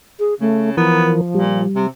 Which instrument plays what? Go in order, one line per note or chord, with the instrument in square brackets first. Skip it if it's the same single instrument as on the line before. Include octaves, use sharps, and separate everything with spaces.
[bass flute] G#4
[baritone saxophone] C#3 [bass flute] A3
[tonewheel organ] E3 A#4 [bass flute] F3 [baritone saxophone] B3
[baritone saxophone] A#2 [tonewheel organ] G3
[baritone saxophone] C3